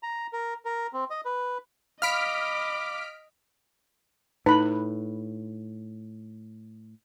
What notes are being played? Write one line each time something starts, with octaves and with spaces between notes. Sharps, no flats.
A#5
A#4
A#4
C4
D#5
B4
D#5 F5 B5 D6 F6 B6 D7
A2 D#4 B4 B5